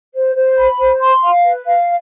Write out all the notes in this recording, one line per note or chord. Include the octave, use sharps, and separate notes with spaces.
C5
C5
B5
C5
C6
F5
B4
F5